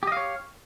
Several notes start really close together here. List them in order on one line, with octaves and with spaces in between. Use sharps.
G4 D#5 F5 C#5